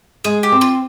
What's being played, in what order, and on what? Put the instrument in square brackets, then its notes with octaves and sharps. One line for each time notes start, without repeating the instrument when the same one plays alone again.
[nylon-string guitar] G#3 [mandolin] G#4
[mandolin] G4
[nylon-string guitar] C4
[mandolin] F4